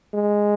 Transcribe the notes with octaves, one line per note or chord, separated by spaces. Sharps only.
G#3